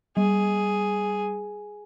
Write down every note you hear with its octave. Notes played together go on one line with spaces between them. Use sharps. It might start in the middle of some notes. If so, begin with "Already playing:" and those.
G3 G#4